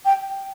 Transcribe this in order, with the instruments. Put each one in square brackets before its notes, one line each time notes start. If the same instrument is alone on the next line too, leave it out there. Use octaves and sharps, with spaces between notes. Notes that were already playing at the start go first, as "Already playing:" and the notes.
[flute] G5